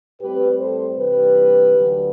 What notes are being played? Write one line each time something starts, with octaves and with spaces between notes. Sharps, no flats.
A2 G3 C4 G4 B4
A4 C5
C3 E3 G3 D4 G4 B4
D2 D3 F#3 B3 D4